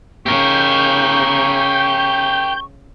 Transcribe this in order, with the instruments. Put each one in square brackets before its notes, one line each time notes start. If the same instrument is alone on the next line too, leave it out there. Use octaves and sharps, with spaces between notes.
[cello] C#3 [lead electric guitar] G4 A#4 [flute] C#6 [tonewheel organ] G6